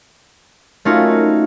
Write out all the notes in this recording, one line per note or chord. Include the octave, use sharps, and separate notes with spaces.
A3 C#4 D#4 F4 F#4 A#4